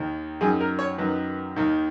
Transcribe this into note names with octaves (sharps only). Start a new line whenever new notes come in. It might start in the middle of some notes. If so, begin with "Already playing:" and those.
Already playing: D#2 D#3
F#2 D#3 G#4
A#4
C#5
F#2 D#3 B4
D#2 D#3